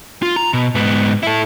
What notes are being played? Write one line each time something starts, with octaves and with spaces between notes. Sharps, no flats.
F4
A#5
B2
G#2 B3
E4 A4